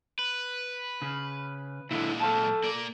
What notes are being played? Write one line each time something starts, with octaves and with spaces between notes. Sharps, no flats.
B4
C#3
A#2 D3 G#3 E4
A4 F5 A5
A#3 D5